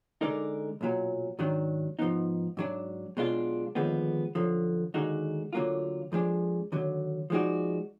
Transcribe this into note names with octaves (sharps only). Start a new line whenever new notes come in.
D3 G#3 D#4 A#4 D5
B1 A#2 F#3
G#2 D#3 F#3 D4
G#2 F3 B3 D#4
G#2 F#3 D4
B1 B2 G#3 D4 F4
D#2 D3 F3 G#3 B3
F#2 D3 F3
D#2 D3 G#3 D#4 F#4
D2 D3 F#3 A#3 F4
F2 F3 G#3 D4
D#2 D3 F#3
F3 G#3 D#4 F#4 D5